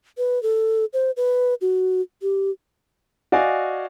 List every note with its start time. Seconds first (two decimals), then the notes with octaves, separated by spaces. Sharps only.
0.18 B4
0.43 A4
0.93 C5
1.17 B4
1.61 F#4
2.22 G4
3.32 F#4 D5 D#5 F5 G#5